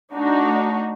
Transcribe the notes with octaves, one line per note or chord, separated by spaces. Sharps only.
A3 D4 D#4 F#4